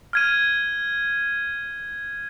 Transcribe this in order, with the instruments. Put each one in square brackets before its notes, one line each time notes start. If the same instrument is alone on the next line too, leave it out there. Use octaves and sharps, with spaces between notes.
[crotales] F6 G#6 D#7